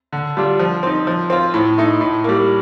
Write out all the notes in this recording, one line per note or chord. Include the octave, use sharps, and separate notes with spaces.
D3
G3 D4 F4
F3
C4 D#4
F3
C4 F4
A2
A3 D#4
A2
G3 A#3